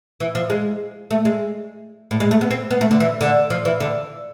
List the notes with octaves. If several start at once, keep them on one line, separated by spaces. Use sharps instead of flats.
E3
F3
G#3
A3
G#3
A2
G#3
A3
B3
C4
B3
A3
D3
E3
D3
F3
E3
D3